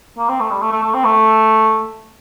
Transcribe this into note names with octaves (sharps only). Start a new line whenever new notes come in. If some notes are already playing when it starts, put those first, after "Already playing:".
A#3
C4
A3
G3
A3
A3
A3
C4
A3